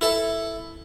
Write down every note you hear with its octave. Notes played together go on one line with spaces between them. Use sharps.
E4 A4 A5